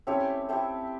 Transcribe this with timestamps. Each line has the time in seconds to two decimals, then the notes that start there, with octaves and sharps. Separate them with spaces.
0.07 A3 C4 C#4 E4 G4 C#5
0.49 A3 C4 E4 G4